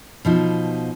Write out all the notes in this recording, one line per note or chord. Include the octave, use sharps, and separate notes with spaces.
B2 F3 D#4